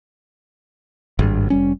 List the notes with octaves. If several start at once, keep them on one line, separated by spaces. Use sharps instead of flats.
G#1 G2
F1 G3 C#4